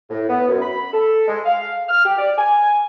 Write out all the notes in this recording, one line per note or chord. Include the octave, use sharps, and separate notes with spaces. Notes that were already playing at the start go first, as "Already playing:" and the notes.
A2
B3
F#2
B5
A4
G#3
F5
F6
G4
D5
G#5